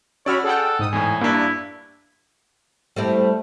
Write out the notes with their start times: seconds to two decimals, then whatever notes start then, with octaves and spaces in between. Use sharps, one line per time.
0.26 C#4 F#4 C#5 D5 B5 E6 F6
0.44 G#4 A4 F#5 G5
0.79 G#2 D#6
0.93 E2 A2 G#5
1.21 G2 A#3 D4 E4
2.96 G3 A3 C4 E4